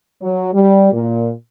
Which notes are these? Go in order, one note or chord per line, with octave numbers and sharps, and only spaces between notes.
F#3
G3
A#2